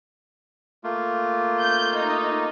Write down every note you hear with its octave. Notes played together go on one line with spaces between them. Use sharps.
A3 A#3 F4
G6
D#4